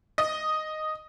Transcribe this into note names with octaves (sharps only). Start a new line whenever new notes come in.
D#5